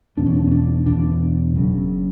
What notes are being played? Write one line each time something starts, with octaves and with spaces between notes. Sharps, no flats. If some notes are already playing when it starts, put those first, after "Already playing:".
E1 E2 B2 D4
C#4
D4
C#4
D4
E1 E2 B2 D4
F#1 F#2 C#3